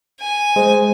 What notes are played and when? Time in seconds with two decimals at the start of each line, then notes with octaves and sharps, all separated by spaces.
0.21 G#5
0.56 G#3 C5